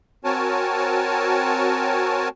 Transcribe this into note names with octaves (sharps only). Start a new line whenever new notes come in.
C4 F#4 A#4 C#5 G#5 A5